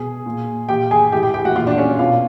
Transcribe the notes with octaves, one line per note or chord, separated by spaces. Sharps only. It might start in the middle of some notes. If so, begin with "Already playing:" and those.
Already playing: B2 G#4
A#2
A#2 G4 G5
G#4 G#5
A2 G4 G5
G4 G5
E3 G4 G5
F#4 F#5
A#2 F4 F5
D4 D5
C#4 C#5
B2 F4 F5